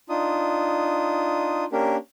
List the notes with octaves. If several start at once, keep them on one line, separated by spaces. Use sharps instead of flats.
D4 D#4 F4 D#6
A#3 C#4 D4 G4 A#4